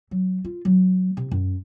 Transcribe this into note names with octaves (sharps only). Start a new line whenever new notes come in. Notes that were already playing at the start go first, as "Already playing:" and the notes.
F#3
F4
F#3
C3
F#2